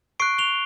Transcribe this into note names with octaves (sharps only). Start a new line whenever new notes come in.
C#6 F#6 C7 D7
F7 G7